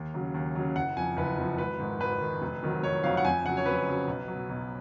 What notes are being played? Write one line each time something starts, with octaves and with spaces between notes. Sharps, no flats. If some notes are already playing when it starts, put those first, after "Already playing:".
Already playing: D#2
C#3 F#3
D#2
C#3 F#3
F#1 F#5
F2 F3 G#5
F#1 B4
F2 F3
G#1 B4
G#2 D#3
G#1 B4
G#2 D#3
F1
F2 D#3 F#3
F1 C#5
F2 D#3 F#3 F5
F#5
F2 G#5
C#3 F#3 F#5
C#5
F2 B4
C#3 F#3
B1
B2 F#3
B1